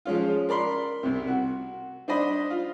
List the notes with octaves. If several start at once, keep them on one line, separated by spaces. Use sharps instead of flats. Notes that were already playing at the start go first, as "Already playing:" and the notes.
F3 G#3 C#4 F4
A#4 D5 B5 C6
C2 C3
F#4
D4 C5 D5 D#5 B5
F4